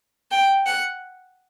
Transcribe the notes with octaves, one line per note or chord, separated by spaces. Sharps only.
G5
F#5